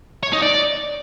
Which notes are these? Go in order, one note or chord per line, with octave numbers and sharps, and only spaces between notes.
C#5
D#4
D5